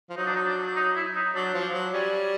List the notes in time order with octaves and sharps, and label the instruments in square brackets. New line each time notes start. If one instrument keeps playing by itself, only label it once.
[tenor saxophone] F3
[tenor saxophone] F#3 [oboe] D#4
[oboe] D4
D#4
D4
D#4
E4
D#4
[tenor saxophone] F#3 [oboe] D4
[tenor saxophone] F3
F#3
[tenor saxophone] G3 [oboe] C#4